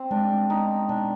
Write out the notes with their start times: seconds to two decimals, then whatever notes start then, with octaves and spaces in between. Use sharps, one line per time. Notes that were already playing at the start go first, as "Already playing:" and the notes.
Already playing: C4
0.11 G#3 D4
0.50 B3 D#4
0.89 B2 D4